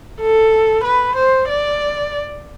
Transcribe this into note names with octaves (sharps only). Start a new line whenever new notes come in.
A4
B4
C5
D5